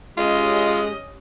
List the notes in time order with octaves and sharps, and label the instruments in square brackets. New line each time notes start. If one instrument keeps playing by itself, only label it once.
[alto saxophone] G#3 [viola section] C#4 G4 D#5 [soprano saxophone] F4